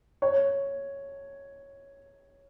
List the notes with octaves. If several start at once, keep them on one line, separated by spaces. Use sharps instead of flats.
C#5